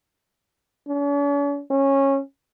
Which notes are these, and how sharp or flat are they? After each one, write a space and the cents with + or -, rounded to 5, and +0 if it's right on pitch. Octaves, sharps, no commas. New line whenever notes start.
C#4 +45
C#4 -15